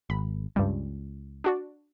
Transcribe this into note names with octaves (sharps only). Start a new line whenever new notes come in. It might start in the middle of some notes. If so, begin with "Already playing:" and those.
G#1 B5
C#2 G2 G3
D4 F#4 D5